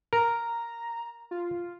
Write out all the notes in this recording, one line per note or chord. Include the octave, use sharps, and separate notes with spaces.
A#4 A#5
F4